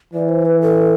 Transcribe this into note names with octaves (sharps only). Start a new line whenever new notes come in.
E3 D5
C5
B4
A4